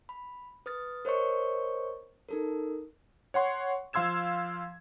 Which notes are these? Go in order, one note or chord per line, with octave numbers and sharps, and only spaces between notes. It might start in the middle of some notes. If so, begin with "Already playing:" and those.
B5
B4 D#6 F6 A6
A#4 C5 C#5 D#5 C#6
D#4 A4 A#4
C#5 F#5 C6 C#6
F3 F5 C6 E6 G#6 E7